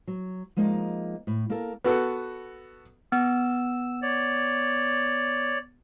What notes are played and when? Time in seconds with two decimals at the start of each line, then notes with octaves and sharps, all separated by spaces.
0.08 F#3
0.57 F3 G#3 A#3 D#4
1.27 A2
1.50 A#3 A4 A#4
1.84 B3 F#4 A4
3.12 B3 E6
4.02 C#5 D5